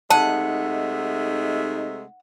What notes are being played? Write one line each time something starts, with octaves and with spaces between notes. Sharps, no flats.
C3 G#3 A3 D#4 F#5 A5